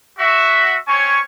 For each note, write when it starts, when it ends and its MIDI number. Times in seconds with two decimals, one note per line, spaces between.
0.19 0.77 66
0.19 0.77 76
0.87 1.19 60
0.87 1.19 61
0.87 1.19 73
0.87 1.19 80
0.87 1.19 85